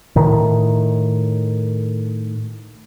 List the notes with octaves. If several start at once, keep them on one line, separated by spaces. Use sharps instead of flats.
A2 D#3